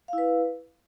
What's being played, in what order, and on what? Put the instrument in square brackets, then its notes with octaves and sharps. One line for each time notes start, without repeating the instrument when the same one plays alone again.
[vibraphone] F5
E4
B4